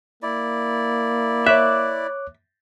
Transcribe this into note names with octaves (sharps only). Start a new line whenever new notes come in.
A#3 E4 D5
C#5 E5 D6 F#6